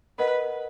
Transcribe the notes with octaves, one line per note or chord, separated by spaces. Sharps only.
A#4 B4 D#5 F#5